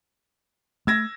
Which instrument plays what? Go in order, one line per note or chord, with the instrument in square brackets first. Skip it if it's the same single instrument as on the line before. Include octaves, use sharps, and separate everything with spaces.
[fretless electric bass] A3 [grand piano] E6 G#6 A#6